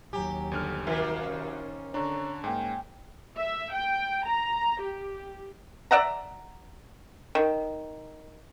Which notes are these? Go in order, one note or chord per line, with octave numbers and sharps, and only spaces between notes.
D#2 F#3 G4 G#5 A#5
G1 D3 F6
C2 D#3 A#3 C4 F#4 A#4 E5
C#4
D3 D4 C#5 A#5 C#6
G#2 A#3 G5 G#5
E5
G5
A#5
G4
D5 E5 F#5 A#5
D#3